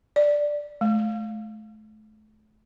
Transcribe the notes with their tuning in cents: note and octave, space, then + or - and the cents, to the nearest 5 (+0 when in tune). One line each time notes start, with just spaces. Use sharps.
D5 +5
A3 -35